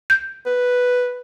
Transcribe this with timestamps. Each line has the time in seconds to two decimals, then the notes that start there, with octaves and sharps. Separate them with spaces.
0.10 G6
0.46 B4